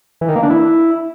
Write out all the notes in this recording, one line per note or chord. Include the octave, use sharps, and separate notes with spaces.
E3
D#3
A#3
D4
E4